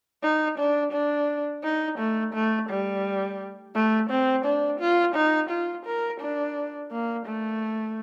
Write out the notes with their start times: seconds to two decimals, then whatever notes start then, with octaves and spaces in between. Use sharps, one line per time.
0.23 D#4
0.59 D4
0.93 D4
1.64 D#4
1.99 A3
2.34 A3
2.70 G3
3.75 A3
4.10 C4
4.45 D4
4.80 F4
5.15 D#4
5.50 F4
5.86 A#4
6.21 D4
6.91 A#3
7.27 A3